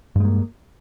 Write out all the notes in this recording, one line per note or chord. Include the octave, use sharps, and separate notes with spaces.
G2 G#3 A#3